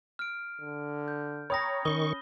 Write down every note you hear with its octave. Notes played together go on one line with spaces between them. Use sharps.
F6 D7
D3
G6
C#5 G5 A#5 B5 D#6 A#6
D#3 C#4 C#6 D#6 G7